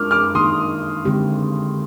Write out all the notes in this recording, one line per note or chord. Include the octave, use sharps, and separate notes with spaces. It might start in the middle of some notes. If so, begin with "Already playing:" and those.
Already playing: G#3 D4 F4 A#4 D6 F6
D6 F6
D#3 A#3 D#4 C6 D#6
D3 G#3 C4 G4